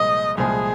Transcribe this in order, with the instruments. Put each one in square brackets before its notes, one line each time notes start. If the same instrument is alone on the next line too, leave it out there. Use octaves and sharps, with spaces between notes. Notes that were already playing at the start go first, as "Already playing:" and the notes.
Already playing: [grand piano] C2 A#2 F3 G#3 [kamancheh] D#5
[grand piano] C2 A#2 F3 G#3 [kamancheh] G#4